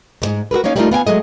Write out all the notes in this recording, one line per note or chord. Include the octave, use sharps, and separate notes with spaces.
D#2 G#2
F#4 G#4 A#4 B4
A#3 C#4 D#4 C#5 F5
G3 A3 A#3 C4 D#4 F4
B3 F5 G5 G#5
F#3 G#3 A3 D#5